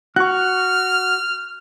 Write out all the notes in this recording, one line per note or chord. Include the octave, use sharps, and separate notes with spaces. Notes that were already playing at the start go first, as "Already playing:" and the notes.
F#4 C#6 F6 F#6